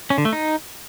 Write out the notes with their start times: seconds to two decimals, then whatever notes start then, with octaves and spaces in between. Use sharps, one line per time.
0.10 C#4
0.18 D3
0.25 A3
0.33 D#4